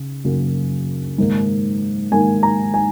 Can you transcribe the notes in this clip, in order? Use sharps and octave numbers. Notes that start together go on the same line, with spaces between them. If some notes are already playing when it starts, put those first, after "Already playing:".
Already playing: C#3
F#2 C#3 F#3 A#3
G#2 D#3 A#3
G#2 D#3 A#3 G#5
A#5
G#5